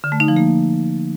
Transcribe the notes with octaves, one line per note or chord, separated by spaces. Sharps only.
D3
A3
D#4
F3
A#3